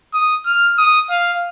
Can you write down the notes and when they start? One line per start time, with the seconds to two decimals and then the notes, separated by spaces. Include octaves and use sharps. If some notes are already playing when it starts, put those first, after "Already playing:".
0.14 D#6
0.46 F6
0.78 D#6
1.10 F5